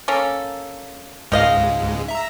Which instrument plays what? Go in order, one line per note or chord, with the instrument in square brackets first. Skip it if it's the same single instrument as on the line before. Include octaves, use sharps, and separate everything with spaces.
[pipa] A#3 C#4 A4
[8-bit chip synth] C#2 G#2 G#3 [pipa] D#3 D#5 F5
[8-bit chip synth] E5 A#5